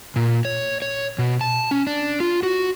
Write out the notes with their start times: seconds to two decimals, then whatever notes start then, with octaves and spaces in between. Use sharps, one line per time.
0.16 A#2
0.45 C#5
0.82 C#5
1.19 B2
1.41 A5
1.71 C#4
1.87 D4
2.20 F4
2.43 F#4